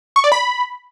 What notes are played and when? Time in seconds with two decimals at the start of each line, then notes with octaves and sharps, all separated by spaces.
0.16 C#6
0.24 D5
0.32 B5